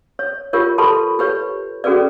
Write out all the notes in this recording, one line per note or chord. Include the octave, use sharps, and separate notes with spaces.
C#5
F4 G4 A#4 C#5
G4 A4 B4 A5 B5 C6
G4 B4 C#5
C#4 F#4 G#4 A4 B4 D5